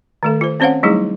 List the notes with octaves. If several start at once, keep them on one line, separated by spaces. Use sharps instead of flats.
D#3 A3 A4
F4 C5
C4 C#4 C5 C#5 F5 F#5
F#3 G3 A3 D#4 E4 G#4